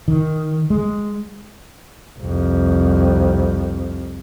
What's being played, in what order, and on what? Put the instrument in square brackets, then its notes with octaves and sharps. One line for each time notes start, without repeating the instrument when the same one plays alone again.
[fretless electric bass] D#3
G#3
[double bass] C2 F2